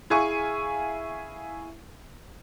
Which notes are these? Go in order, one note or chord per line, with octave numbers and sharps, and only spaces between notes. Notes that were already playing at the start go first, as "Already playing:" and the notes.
E4 G#4 F5 G#5 C#6